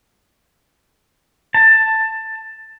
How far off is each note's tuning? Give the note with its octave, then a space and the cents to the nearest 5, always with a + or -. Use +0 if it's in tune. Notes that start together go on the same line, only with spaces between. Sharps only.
A5 +10